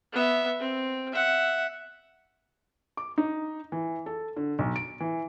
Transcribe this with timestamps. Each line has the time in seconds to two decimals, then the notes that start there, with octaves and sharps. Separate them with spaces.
0.13 B3 E5
0.59 C4
1.13 E5 F#5
2.97 D6
3.18 D#4
3.72 E3
4.06 A4
4.37 D3
4.59 B1
4.76 D7
5.00 E3